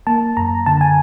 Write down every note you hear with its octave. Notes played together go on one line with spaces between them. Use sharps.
A#3 A5
F#2 A#5
D3 A5
G#5